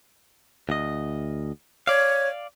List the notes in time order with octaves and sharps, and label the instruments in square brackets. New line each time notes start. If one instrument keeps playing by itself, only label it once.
[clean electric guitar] D2 D#5
[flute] C#5 [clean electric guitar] D5 F5